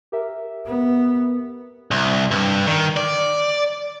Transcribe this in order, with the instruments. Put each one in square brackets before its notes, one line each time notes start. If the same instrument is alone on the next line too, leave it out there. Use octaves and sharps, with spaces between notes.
[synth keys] G4 A#4 E5
[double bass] B3
[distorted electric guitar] C2
G2
D#3
D5